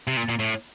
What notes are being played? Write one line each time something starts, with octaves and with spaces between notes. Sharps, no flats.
C3
A#2
A#2
A2